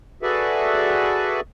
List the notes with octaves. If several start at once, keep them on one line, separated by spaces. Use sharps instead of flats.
F#4 G#4 A4 B4 D5 E5